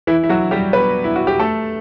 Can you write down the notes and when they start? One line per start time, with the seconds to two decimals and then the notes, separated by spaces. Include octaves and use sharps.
0.07 E3 E4
0.24 E4
0.29 F#3 F#4
0.51 G3 G4
0.73 B3 B4
1.04 E4
1.16 F#4
1.27 G4
1.39 A3 A4